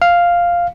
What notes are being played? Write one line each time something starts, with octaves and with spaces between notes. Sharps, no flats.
F5